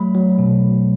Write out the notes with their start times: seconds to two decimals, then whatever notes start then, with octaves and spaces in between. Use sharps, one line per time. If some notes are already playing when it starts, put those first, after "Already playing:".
Already playing: F#3 A3 B5
0.15 F#3
0.39 B2